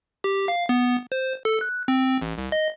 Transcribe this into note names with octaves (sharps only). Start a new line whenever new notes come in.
G4
F5
B3
C5
A4
F#6
C4
A1
C2
D#5